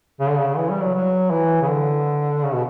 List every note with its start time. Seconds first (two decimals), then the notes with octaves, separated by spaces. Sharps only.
0.20 C#3
0.29 D3
0.39 C#3
0.57 E3
0.70 G3
0.82 F#3
0.94 F#3
1.31 E3
1.62 C#3
1.68 D3
2.44 C#3
2.54 B2